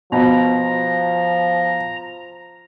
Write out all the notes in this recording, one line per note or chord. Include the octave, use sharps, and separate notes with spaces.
B2 F3 A#5